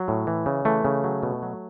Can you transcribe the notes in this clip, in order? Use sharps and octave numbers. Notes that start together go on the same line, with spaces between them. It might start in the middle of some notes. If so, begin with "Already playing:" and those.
Already playing: F#3
A2
E3
C#3
E3 A3
C#3
F#3
B2
F#3